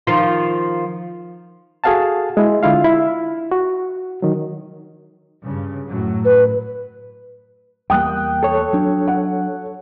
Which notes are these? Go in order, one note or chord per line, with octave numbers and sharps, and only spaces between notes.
D#3 F3 F4
F#4 G#4 A4 F5 F#5 A5
G#3 E4
D3 E4 F4 F5
E4
F#4
D#3 F#3
G2 C#3
F#2 A2 F#3
B4
E2 G3 A#3 G5 D#6 F#6
A4 C#5
F#3 D4
F#5